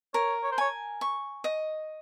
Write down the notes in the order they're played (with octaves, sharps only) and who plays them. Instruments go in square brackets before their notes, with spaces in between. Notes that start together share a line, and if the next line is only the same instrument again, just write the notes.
[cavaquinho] A#4 [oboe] C#5
[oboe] C#5
C5
[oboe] C#5 [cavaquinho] G#5
[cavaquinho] C#6
D#5